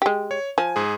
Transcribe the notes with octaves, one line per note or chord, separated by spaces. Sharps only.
G#3 G4
C#5
F3 G#5
G#2 G#4